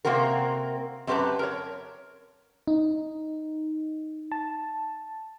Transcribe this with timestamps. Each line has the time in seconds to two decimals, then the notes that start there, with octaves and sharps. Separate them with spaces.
0.05 C3 A#3 C4 F#4 A#4
1.07 F#2 C4 G4 B4 A5 A#5
1.39 A#4 C#5
2.67 D#4
4.32 A5